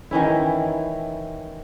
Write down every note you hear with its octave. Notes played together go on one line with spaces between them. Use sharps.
D#3 E3 C#4 E4